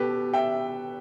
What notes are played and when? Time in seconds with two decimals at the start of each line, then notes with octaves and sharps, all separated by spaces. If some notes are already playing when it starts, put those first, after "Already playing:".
Already playing: B2 B3 G4 A4 B4
0.33 E5 G5